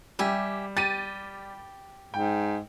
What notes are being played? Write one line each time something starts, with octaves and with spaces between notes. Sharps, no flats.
G3 G4 E5 G#5
G4 A6 D#7
G#2 G5